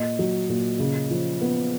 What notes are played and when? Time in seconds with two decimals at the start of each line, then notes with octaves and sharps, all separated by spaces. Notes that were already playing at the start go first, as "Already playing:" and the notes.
Already playing: A#2 D#5
0.19 F#3
0.49 A#2
0.79 C#3
1.11 F3
1.41 B3